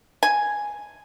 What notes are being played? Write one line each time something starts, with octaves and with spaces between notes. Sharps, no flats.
G#5